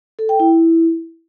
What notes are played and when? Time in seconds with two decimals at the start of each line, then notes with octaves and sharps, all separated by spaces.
0.19 A4
0.29 G5
0.40 E4